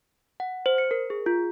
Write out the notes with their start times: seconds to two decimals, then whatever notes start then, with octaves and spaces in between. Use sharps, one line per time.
0.40 F#5
0.66 C5
0.78 C#7
0.91 A#4
1.10 G#4
1.26 F4